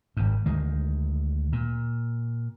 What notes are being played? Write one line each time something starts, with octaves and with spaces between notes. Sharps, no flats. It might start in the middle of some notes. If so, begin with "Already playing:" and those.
G#1 G2
D2 D#3 G#3
A#2